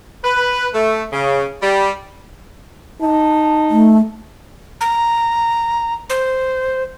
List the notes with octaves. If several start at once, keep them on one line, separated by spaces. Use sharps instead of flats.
B4
A3
C#3
G3
D#4 A5
A3
A#5
C5